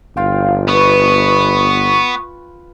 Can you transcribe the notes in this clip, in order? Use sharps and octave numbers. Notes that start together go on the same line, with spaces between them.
G1 F4 F5 G5
B3 B4 C#6